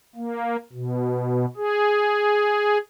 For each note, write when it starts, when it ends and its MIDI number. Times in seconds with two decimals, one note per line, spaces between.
0.16 0.57 58
0.72 1.46 47
1.57 2.78 68